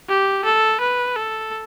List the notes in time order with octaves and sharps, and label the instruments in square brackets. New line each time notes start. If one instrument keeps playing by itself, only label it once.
[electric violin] G4
A4
B4
A4